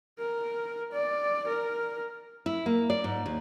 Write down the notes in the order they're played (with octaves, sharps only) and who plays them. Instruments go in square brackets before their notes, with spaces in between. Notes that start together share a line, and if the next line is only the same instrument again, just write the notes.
[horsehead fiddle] A#4
D5
A#4
[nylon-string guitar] E4
A#3
D5
G#2
D#2